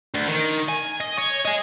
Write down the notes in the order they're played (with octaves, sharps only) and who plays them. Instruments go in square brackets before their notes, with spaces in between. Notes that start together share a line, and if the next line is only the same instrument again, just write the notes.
[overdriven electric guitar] D2
D#3
G#5
D#5
C#5
D#5 G#5